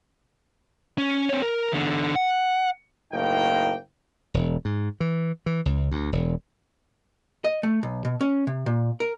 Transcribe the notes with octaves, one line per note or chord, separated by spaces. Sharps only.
C#4
C4 C#5
A#4
E2 D3
F#5
F#1 A2 A#3 D#4 G5
E1
G#2
E3
E3
C#2
D2
E1
D#5
A3
B1
B2
C#4
C3
A#2
A#4